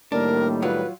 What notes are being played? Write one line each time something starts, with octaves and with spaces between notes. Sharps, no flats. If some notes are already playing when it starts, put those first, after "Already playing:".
A2 D#3 G3 A#3 D4 A#4
F#3 F4 B4